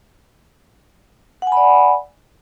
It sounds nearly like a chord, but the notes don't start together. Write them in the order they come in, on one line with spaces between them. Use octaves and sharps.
F#5 G#5 B5 D5